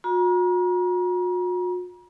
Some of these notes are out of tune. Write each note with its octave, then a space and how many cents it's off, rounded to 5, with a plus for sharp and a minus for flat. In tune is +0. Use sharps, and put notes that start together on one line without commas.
F#4 -45 A#5 +40